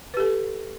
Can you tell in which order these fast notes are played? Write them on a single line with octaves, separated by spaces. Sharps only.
B4 G4 A4